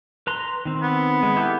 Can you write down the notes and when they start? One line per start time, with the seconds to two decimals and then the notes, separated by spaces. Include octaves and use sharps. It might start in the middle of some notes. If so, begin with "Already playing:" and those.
0.27 B4 A#5 C6
0.65 D#3 C4
0.82 B3
1.23 G#3
1.36 E4 G4 A4